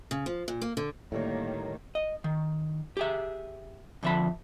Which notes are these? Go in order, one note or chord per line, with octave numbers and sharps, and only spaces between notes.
C#3
F3
A#2
A#3
D3
A2 D3 D#3 G3 A#3 C#5
D#5
D#3
G4 G#4 E5
F2 D3 F3 E5 A5 B5